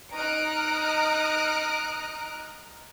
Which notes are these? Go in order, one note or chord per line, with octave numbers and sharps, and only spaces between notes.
D#4 A#5 D#6 F6 F#6 D7